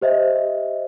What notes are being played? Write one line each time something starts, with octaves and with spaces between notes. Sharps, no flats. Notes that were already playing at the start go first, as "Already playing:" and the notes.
G4 C5 D#5 E5